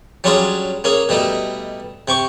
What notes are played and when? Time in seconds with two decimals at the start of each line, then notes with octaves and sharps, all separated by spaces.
0.24 F#3 G3 C#4 D4 F4 G#4
0.84 A#3 C#4 G#4
1.09 B2 G3 A3 D#4
2.08 C3 G5 C#6 D6